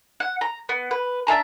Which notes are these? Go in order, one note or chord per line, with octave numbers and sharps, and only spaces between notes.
F#5
A#5
B3
B4
D4 E5 A5 A#5